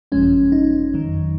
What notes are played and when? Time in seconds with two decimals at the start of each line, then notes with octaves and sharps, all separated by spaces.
0.12 G#1 F#2 F3 G#3 C#4
0.52 D#4
0.94 F2 D#3 F#3